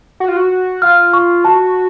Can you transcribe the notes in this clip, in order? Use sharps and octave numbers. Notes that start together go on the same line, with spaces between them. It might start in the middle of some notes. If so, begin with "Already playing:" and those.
F#4
F4
F#4
F4 F6
C#6
F#4 A5